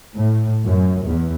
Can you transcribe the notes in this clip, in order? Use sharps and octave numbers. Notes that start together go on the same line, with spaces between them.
A2
F#2
E2